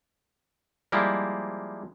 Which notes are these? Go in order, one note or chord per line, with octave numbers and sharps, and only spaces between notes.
F3 G3 G#3 A#3 E4